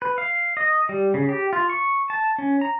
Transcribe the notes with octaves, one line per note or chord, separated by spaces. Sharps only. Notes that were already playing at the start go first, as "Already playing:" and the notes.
B4
F5
D#5
G3
C#3
G4
F4
C#6
A5
C#4
A#5